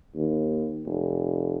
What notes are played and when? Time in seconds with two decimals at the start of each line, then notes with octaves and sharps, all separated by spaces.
0.15 D#2
0.86 F1